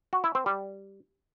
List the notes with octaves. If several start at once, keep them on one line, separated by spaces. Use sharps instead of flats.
F#4
E4
C4
G3